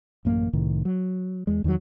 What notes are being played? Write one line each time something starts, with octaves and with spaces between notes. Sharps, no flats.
A1 F#2 A#3
C2 A2 D#3
F#3
E2 G#3
E2 D#3 E3 F#3